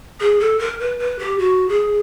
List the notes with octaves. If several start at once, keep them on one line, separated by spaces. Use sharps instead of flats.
G#4
A4
A#4
B4
B4
G4
F#4
G#4